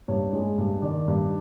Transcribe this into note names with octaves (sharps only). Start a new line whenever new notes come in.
G2 C#5
G#3
G2
D#3 D5
G2